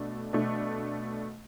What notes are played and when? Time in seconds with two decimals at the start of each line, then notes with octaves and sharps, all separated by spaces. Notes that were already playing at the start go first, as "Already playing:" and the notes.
Already playing: B2 A3 D4
0.33 B2 A3 D4